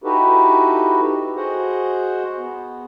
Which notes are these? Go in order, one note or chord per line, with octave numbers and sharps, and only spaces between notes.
D#4 E4 F#4 G4 A4 B4
F#4 G#4 C5 D#5 F#5
B3